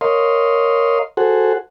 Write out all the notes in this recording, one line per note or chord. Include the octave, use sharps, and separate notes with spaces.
A#4 C#5 D#5 F5 C6
F#4 G#4 A4 C5 F#5